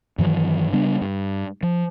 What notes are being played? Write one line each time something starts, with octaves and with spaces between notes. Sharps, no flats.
G2 D#3 E3 F#3
C#3 G3 B3 D4
G2
F3